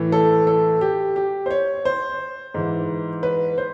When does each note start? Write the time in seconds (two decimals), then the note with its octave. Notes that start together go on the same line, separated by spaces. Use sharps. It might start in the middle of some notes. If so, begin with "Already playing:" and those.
Already playing: A2 E3
0.12 A4
0.47 A4
0.81 G4
1.16 G4
1.46 C5
1.50 C#5
1.85 C5
2.54 G#2 E3
3.23 B4
3.58 C5